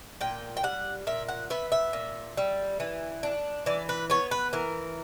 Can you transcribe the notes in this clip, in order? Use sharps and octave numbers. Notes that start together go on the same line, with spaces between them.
A#2 G5
G5
G3 F#5
A#2 E5
F#5
B3 E5
E5
A#2
G3
E3
D4
E3 D5
B4
B3 C#5
B4
E3 A#4